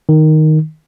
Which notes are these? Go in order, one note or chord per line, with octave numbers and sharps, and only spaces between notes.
D#3